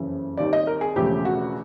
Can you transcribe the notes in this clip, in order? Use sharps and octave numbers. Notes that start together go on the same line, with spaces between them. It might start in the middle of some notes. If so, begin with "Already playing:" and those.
Already playing: F#1 F2 C#3 E3
D#2 D#3 G3 C4 D5
D#5
A#4
G#4
E1 E2 C#3 F3 A3 G4
F#4